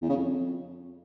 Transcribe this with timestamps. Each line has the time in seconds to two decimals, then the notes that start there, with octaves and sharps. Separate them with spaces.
0.02 E2
0.09 C#3
0.16 F2